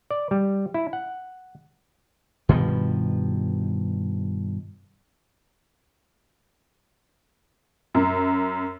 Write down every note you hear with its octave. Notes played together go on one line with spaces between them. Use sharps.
D5
G3
E4
F#5
G2 B2 D#3 F3
F#2